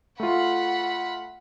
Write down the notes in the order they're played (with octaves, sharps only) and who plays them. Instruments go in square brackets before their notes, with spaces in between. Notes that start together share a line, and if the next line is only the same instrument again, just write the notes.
[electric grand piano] A3 F4 [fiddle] F#5 B5